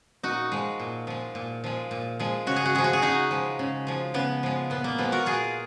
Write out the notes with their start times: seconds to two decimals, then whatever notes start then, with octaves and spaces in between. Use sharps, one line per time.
0.23 A#2 D#4 F#4
0.52 F3 G#3
0.80 A#2
1.07 F3 G#3
1.35 A#2
1.64 F3 G#3
1.91 A#2
2.19 F3 G#3
2.47 C#3 F#4
2.56 G#4
2.65 F#4
2.75 F3 G#3 G#4
2.84 F#4
2.93 G#4
3.02 C#3 D#4 F#4
3.31 F3 G#3
3.59 C#3
3.87 F3 G#3
4.14 C#3 B3
4.43 F3 G#3
4.70 A#2 B3
4.84 A#3
4.98 F3 G#3 B3
5.12 F#4 A#4
5.26 A#2 F4 G#4